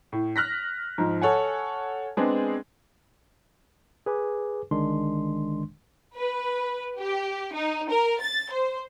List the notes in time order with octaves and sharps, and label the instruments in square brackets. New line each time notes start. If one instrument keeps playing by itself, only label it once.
[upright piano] A2
F6 F#6 A#6 B6
G#2 F3
A4 C#5 F#5 G#5
G#3 B3 C4 D4 G#4
[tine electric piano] G#4 B4 G#5 D6
G1 D3 D#3 G#3 D4 C6
[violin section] B4
G4
D#4
A#4
A6
C5